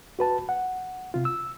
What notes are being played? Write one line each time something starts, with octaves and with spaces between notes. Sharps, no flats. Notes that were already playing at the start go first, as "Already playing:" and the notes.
F#4 B4 A5
F#5
C3 F4
E6